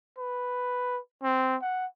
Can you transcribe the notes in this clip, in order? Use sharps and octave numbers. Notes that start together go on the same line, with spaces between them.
B4
C4
F#5